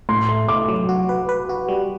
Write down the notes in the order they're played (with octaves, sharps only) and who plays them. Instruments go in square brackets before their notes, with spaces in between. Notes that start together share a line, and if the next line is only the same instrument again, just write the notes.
[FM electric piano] A2 [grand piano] C6
[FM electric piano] A3
[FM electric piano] A3 [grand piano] D6
[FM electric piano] F#3
F#4
B4
B4
F#4
G3